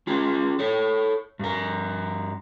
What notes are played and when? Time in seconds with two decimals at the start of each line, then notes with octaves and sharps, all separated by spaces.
0.07 C#4 F4 G#4
0.59 A4 C#5
1.39 G2 A#4